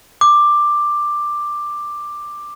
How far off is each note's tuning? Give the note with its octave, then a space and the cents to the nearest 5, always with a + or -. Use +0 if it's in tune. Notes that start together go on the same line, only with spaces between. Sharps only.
D6 +10